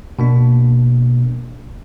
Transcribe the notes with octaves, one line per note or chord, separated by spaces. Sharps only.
B2 A#3 D4